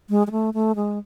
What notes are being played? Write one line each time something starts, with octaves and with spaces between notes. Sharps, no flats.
G#3
G#3
A3
A3
G#3